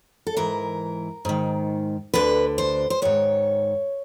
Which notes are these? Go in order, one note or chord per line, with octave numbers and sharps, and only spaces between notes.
A4
G#2 E3 A#4
G#2 D#3
D2 D3 B4
C5
C5
G#2 D#3 C#5